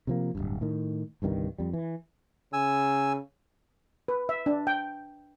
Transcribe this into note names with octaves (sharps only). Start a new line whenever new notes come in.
C3 F3 A#3
D1 C2 G2
A2 D#3
G1 C2 G2 D#3
F2 G3
E3
C#3 G#5 E6
B4
E5
D4
G5